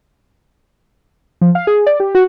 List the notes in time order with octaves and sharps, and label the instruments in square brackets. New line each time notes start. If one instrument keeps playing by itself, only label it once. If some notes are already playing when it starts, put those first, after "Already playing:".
[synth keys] F3
F5
G#4
D5
G4
F#4